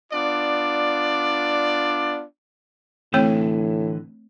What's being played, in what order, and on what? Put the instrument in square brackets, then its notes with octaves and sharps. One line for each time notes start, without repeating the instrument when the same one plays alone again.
[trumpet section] B3 D4 F4 D5
[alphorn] A2 [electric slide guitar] D3 E3 [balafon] A3 C4 C#5